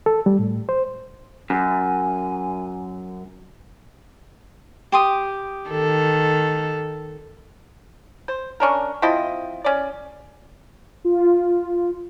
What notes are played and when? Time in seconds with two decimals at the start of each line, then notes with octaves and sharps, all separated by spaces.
0.06 A4
0.26 G3
0.39 A2
0.69 C5
1.50 F#2 G#5
4.92 G4 C6 D#6
5.69 D#3 A4
8.28 C5
8.60 C#4 D4 A#4
9.02 F3 C4 E4 D#5
9.64 C#4 D5
11.05 F4